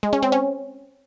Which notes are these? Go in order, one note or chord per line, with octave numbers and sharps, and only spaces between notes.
G#3
C#4
C4
C#4